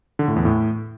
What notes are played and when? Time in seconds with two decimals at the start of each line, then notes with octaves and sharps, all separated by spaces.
0.19 D3
0.28 A2
0.36 E2
0.45 A2